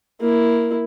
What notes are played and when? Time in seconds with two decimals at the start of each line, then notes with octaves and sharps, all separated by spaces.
0.20 A#3 E4